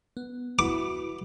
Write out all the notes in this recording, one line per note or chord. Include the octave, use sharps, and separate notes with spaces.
B3
E4 F#4 B4 D6